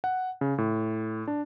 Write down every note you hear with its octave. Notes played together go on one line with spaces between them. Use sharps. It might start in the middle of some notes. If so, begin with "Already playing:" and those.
F#5
C#3
A2
D4